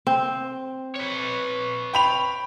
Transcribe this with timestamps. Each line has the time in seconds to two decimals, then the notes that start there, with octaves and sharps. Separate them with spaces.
0.07 C4
0.95 B4 C#5
1.94 G5 B5 F7